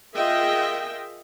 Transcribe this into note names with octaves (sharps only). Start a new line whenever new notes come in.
F4 G#4 A#4 D#5 E5 G5